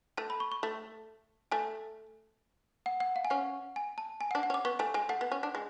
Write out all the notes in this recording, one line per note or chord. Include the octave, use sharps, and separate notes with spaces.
A3 A5
B5
C#6
C#6
A3
A3 G#5
F#5
F#5
F5
G#5
C#4 F#5
G#5
A5
G#5
F#5
D4
F#5
C#4
D6
B3 C#6
A3 G#5
G#3 G#5
A3 F#5
B3
C#4
D4
G#3